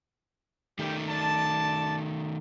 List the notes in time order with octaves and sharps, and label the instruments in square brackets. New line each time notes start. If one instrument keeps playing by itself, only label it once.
[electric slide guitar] D#3 A3 [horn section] G3 G4
[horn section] D5 A5